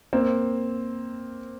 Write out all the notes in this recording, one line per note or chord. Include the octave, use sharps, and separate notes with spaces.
A#3 C4